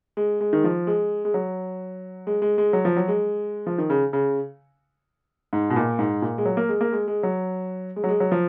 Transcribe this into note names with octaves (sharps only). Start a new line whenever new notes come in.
G#3
G#3
D#3
F3
G#3
G#3
F#3
G#3
G#3
G#3
F#3
F3
F#3
G#3
F3
D#3
C#3
C#3
G#2
B2
A#2
G#2
A#2
G#3
F#3
A#3
G#3
A#3
G#3
G#3
F#3
G#3
F#3
G#3
F#3
F3